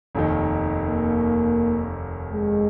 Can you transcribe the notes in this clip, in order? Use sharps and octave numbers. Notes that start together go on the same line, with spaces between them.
F1 D#2 D#3
A#3
G#3